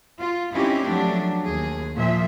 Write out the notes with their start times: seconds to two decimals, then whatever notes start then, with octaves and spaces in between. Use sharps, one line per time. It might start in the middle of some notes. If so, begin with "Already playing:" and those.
0.21 F4
0.54 C4 C#4 D#4 E4 G4
0.85 F3 F#3 A3 D4
1.43 D#2 G#4
1.96 A#2 F3 E5